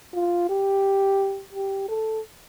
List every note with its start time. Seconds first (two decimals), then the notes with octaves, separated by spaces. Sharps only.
0.14 F4
0.49 G4
1.52 G4
1.89 A4